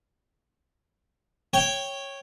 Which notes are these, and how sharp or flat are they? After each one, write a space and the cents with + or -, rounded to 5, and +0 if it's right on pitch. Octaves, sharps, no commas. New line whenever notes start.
C#5 -10 G5 +0